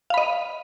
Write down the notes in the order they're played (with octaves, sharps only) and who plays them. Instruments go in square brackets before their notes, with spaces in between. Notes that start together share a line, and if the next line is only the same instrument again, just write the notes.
[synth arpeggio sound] F5
B5
D#5